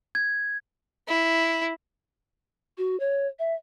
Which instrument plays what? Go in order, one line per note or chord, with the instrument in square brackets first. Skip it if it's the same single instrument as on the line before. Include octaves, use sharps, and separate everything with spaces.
[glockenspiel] G#6
[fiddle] E4
[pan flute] F#4
C#5
E5